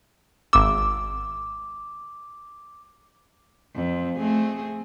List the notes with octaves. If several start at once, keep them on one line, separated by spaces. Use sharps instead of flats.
G#1 D6 E6
F2
A3 C4 G#4